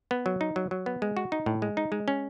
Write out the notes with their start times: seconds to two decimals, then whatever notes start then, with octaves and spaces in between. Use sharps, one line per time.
0.11 B3
0.26 F#3
0.41 D#4
0.56 F#3
0.71 F#3
0.86 B3
1.02 G#3
1.17 F#4
1.32 D#4
1.46 A2
1.62 G#3
1.77 D#4
1.92 G#3
2.08 C#4